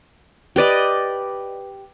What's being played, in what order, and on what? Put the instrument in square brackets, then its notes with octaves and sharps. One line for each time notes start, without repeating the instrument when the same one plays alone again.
[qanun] G4 B4 D5 D#5